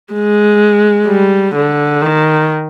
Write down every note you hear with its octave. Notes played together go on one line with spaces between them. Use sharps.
G#3
G3
D3
D#3